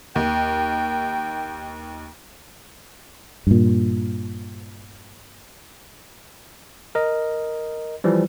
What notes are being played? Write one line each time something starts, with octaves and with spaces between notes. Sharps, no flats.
D#2 G5
G2 A#2
A#4 D#5
E3 F3 G3